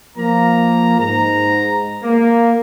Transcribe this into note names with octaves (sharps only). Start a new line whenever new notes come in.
F3 A#3 A#5
G#2 A#5
A#3